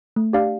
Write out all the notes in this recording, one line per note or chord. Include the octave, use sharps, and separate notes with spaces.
A3
D4 G4 D5 F5